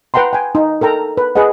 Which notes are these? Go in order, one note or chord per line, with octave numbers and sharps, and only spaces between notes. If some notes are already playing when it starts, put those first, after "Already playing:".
B4 F#5 G5 A#5 C6
G5 G#5
D#4
A4 A#4 G5 A#5
B4
G#4 B4 D#5 F#5